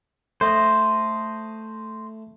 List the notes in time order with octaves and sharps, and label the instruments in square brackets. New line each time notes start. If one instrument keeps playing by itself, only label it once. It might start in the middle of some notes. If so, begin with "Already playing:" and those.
[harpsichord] A3 [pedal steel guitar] C5 D#5